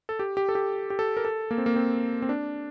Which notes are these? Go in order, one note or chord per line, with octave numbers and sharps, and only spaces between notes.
A4
G4
G4
A4
G4
G4
A4
A#4
A4
A#3
C4
A#3
C4
C4
D4